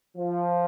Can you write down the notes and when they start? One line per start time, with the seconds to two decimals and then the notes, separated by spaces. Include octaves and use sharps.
0.17 F3